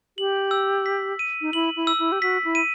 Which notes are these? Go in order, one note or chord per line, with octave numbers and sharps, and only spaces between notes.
G4 F#7
E6
B6
D#7
D#4
E4 F#7
E4
E6
E4
G4
F#4 B6
E4
D#7